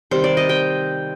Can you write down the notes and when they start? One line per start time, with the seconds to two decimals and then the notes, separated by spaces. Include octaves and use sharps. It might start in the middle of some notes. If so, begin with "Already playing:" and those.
0.11 C3 D#3 G3 C5
0.24 D5
0.37 D#5
0.49 G5